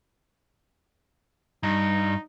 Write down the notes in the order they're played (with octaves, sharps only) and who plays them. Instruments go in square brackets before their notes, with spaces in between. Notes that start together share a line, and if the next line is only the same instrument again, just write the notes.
[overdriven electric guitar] G2 [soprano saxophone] D#4